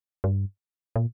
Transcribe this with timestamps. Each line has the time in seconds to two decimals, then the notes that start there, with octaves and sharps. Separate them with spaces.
0.24 G2
0.96 A#2